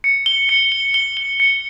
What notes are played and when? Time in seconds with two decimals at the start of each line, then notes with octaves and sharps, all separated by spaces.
0.04 C#7
0.26 G7
0.49 C#7
0.72 G7
0.94 G7
1.17 G7
1.40 C#7